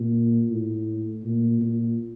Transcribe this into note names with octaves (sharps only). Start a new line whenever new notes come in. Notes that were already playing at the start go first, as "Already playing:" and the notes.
Already playing: A#2
A2
A#2
A#2